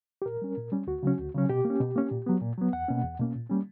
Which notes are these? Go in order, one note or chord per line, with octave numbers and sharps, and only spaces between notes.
G4
A#2 A#4
G3 C#4
A#2
G3 C#4
D2 F#4
C#3 F#3 C#4
D2
C#3 F#3 C#4
B2 G4
A#3
C#4
B2
A#3 C#4
A#2
F#3 B3
A#2
F#3 B3
E2 F#5
B2 A#3 C#4
E2
B2 A#3 C#4
A#2
G3 A#3 C#4